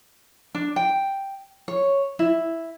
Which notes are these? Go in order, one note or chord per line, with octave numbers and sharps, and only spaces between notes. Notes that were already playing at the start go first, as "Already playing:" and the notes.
D4
G5
C#5
E4